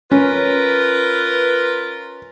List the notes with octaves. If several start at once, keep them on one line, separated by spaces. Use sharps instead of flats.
C#4 F4 A#4 B4